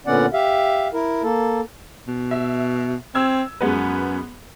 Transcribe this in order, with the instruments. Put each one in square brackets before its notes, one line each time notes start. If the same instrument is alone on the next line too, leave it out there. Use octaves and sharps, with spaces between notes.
[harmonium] A#2 D3 B3 C#4 D5 F#5
G4 E5 F5
E4 A#4
A#3 A4
[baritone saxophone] B2
[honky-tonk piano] E5
[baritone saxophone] C4 [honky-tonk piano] E6 G#6
[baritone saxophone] F#2 [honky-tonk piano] G#3 B3 B4